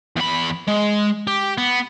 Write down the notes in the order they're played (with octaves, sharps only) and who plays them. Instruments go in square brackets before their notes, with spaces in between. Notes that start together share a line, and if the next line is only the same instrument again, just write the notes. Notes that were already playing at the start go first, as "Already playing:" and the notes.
[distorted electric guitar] E2 B5
G#3
G4
B3